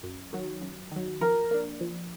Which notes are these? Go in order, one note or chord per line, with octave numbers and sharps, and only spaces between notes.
F#2
D#3 F#3
F#2
D#3 F#3
F3 A#4
A#3 D4
F3